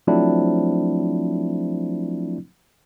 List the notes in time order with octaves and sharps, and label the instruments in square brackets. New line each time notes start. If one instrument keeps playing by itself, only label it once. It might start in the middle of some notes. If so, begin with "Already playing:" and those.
[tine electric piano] F3 F#3 A3 C4 D4 E4